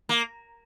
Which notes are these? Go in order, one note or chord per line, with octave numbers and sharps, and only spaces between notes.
A#3